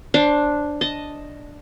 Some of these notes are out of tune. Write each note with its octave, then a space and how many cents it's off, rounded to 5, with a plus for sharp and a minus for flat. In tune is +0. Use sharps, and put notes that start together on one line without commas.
D4 +0 C5 +20
D#5 +0 A5 +0